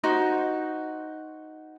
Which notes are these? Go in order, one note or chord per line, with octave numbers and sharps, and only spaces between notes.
D#4 F#4 C5